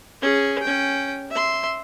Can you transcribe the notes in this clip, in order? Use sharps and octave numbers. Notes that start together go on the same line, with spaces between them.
C#4 G#4
C#4 G5
E5 C6